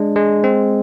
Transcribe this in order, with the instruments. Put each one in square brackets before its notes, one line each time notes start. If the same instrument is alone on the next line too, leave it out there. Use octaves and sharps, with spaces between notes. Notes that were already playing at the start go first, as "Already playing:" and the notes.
Already playing: [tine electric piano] G#3 D4
G#3
C4